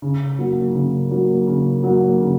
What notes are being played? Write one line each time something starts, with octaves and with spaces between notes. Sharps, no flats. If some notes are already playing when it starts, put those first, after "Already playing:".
C#3
F#3 A#3
C#3
F#3 A#3
C#3
F#3 A#3
C#3